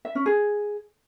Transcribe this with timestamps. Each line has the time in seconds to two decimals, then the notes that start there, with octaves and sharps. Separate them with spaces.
0.05 E5
0.15 C#4
0.26 G#4